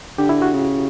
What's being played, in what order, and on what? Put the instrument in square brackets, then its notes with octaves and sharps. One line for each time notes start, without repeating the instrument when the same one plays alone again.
[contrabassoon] D3 [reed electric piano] G4
[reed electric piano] E4
F#4
[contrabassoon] C#3